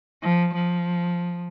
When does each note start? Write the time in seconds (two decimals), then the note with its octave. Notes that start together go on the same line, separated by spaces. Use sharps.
0.23 F3
0.55 F3